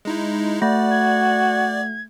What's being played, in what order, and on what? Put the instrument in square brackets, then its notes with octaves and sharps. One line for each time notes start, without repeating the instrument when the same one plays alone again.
[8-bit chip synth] G#3 D#4 E4
[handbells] A3 [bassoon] F#4 [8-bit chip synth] D5
[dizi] G#6